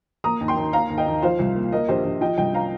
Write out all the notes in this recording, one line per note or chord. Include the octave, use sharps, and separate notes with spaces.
A#3 A#5 D#6
D#2
G5 C6
D#2
A#3 F5 A#5
D#2
D#5 G5
D#2
F3 C5 F5
C2
A#3
A#3 A#4 D#5
A#1 G4 C5
A#1
F3 D#5 G5
C2 D#5 G5
F5 A#5